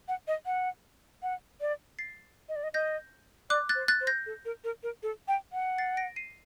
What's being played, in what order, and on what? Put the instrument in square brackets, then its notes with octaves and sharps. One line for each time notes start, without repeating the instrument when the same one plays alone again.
[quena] F#5
D#5
F#5
F#5
D5
[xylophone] A6 C7
[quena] D#5
D5
D#5
[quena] D#5 [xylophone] G6 A#6
[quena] D5 [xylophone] D6 F#6
[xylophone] F#6 A6
[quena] C5
[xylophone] F#6 A6
[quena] C5
[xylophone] G6 A#6
[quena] A4
A#4
A#4
A#4
A4
G5
F#5
[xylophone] A6 C7
A#6 D7
C7 D#7